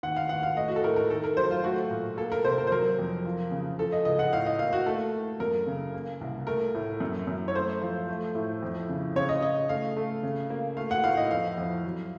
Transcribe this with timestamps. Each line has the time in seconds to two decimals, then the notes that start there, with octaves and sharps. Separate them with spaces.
0.03 D#2 F#5
0.16 F5
0.29 D#2 F#5
0.43 F5
0.56 A3 D#5
0.68 F#4
0.76 A4
0.84 A2 A#4
0.96 A#4
1.10 D#3 A4
1.24 A#4
1.37 F#3 C5
1.51 F4
1.64 A3 F#4
1.91 A#2
2.17 A#3 A4
2.32 A#4
2.44 C3 C5
2.58 A#4
2.67 C5
2.71 F#3 A#4
2.99 F2
3.25 F3
3.51 C#3
3.79 F3 A4
3.92 D#5
4.05 C#2 D#5
4.19 F#5
4.33 A2 F5
4.46 D#5
4.59 A#3 F5
4.73 F#4
4.86 A3 A4
5.13 A3
5.40 F#2 A#4
5.67 C#3
5.94 A#3
6.21 C2
6.47 A3 A#4
6.74 A2
7.00 F#2
7.27 F#2
7.48 C#5
7.55 A3 C5
7.81 F3
8.09 A3
8.35 A2
8.62 F2
8.89 C#3
9.15 C#3 C#5
9.29 D#5
9.42 C#3 D#5
9.69 A3 F5
9.97 A3
10.23 C#3
10.50 A#3
10.77 A3 F5
10.91 F#5
11.03 A2 F5
11.17 D#5
11.31 F2 F5
11.58 F2
11.85 F#3